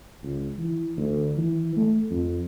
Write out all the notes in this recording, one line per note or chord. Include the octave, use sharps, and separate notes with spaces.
C#2
E3
D2
E3
A3
F2